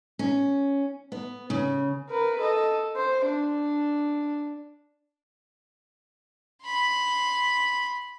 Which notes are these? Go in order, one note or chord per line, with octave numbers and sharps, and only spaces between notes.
C#4
B3
C#3
A#4 B4
A4 D#5
C5
D4
B5 C6